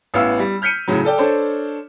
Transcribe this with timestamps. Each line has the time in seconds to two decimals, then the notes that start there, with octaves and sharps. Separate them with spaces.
0.14 A1 B3 E4 F5 E6
0.39 G3
0.62 F6 G6 B6 C#7 D#7
0.88 A2 C#3 F#3
1.05 A4 D5 G5
1.18 D4 A4 C5 C#5